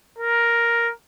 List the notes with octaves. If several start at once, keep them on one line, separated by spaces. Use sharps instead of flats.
A#4